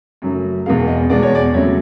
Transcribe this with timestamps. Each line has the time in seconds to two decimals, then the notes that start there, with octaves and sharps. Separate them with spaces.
0.22 F#2 C#3 F#3 A3
0.66 E2 B2 G#3 F5
0.88 D#5
1.10 E2 B2 G#3 D5
1.23 C#5
1.35 D5
1.53 F2 C#3 F#3 A3 C#5